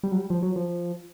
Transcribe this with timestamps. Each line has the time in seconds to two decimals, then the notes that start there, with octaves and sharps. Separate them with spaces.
0.03 G3
0.12 F#3
0.17 G3
0.30 F3
0.42 F#3
0.56 F3